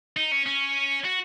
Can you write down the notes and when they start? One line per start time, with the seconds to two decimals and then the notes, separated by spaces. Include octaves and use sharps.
0.17 D#4
0.32 C#4
0.46 C#4
1.04 F#4